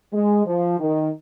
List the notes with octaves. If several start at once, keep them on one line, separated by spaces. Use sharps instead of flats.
G#3
F3
D#3